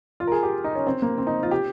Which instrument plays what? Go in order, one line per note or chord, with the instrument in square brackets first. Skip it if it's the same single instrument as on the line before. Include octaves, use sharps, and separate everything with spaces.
[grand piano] F4
A#4
G#4
G4
D#4
C#4
C4
A#3
C4
D#4
F4
G4